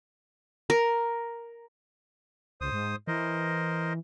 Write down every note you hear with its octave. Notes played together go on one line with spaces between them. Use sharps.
A#4
C#2 C5 D#6
G#2
E3 A#4 C5 D#5